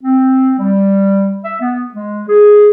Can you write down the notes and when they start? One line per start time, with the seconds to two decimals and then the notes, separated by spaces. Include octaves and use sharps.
0.03 C4
0.59 G3
1.43 E5
1.60 B3
1.93 G#3
2.28 G#4